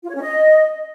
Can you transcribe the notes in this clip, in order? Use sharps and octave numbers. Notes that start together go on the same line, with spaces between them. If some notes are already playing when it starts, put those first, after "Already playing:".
F4
C#5
C#4
D#5